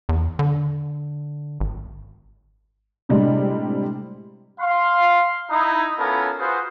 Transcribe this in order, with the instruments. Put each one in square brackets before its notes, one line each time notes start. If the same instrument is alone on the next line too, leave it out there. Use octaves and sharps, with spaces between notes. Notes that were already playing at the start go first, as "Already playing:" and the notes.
[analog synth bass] E2
D3
G#1
[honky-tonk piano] A2 C3 G3 G#3 D4
[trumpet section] F5 C6
D#4 E4
B3 C#4 E4 F4 A4 A#4
F4 F#4 G#4 B4 C5